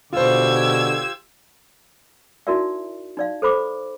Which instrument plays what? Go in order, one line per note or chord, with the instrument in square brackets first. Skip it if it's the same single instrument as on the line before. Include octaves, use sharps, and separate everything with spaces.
[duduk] B2 [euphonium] D3 [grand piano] F4 C5 [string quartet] G4 E6 G#6
[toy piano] D#4 E4 F#4 A#4 D5 E5
D#4 D5 F5
A4 C5 B5 D6